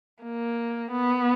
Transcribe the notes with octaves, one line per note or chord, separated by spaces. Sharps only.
A#3
B3